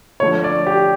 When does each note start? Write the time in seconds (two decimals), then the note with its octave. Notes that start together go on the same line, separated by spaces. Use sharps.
0.20 D3 F3 A3 C#5
0.44 D5
0.67 G4